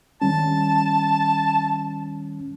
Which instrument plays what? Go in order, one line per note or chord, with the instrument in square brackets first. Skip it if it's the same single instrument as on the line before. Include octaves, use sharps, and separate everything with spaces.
[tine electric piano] D#3 G3 C#4 [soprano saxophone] A5